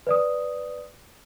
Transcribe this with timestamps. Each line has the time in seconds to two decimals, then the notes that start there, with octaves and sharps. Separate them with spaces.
0.07 B4 D5 D#6